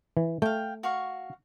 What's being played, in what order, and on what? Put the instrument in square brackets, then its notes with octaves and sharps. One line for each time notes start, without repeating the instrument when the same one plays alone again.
[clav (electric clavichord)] E3
[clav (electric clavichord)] A3 [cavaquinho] F5 G5
[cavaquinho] F#4 F5 C#6